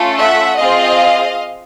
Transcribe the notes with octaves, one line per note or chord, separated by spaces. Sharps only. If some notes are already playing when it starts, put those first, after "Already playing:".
Already playing: A3 C#4 F4 A4
E5 F#5
C4 F4 G#4 D#5 F5